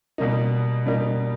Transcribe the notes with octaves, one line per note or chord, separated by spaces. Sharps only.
B2 G3 A#3 D#4
B2 G3 A#3 D#4